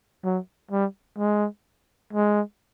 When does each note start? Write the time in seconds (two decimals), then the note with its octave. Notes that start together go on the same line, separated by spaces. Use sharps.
0.24 F#3
0.71 G3
1.18 G#3
2.13 G#3